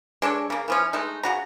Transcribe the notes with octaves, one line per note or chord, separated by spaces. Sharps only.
G#3 D4 A4 C#5
C#3 A#3
E3 F3 C#4
G#3 A3 D#4
C#3 F#4 A#5